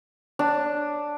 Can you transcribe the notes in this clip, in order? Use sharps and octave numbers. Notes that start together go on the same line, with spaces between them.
D4